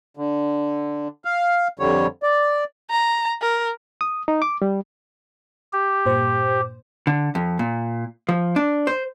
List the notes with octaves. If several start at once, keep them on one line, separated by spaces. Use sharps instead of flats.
D3
F5
F2 D3 G3 C#5
D5
A#5
A#4
D#6
D#4
D6
G3
G4
G2 A#2 C5
D3
F2
A#2
F3
D4
C5